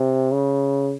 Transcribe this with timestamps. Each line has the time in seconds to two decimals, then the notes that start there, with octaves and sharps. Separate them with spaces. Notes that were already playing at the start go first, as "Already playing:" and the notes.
Already playing: C3
0.32 C#3